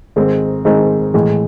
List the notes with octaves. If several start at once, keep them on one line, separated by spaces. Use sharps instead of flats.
G#2 D#3 G#3 C4 D#4
G#2 D#3 G#3 C4 D#4
A2 E3 G#3